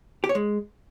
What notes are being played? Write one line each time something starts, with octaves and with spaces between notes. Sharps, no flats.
G4
C#5
G#3